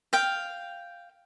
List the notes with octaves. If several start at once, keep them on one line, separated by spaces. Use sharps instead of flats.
F5 G5